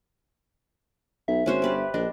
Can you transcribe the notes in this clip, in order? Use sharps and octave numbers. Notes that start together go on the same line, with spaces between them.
B1 E5
G#1 C#4 F#4 C5
G1 G4 B4 D5
A#1 D4 D#5